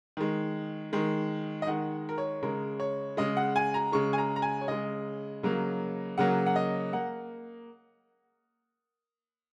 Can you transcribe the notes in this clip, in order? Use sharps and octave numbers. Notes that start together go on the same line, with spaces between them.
D#3 G#3
D#3 G#3
D#5
D#3 G#3 F#5
A#4
C#5
C#3 G#3 A#4
C#5
C#3 G#3 D#5
F#5
G#5
A#5
C#3 G#3 C#6
G#5
A#5
A#5
G#5
C#5
C#3 G#3 D#5
C#3 F#3 A#3
C#3 F#3 A#3 F#5
F#5
D#5
A#3 F#5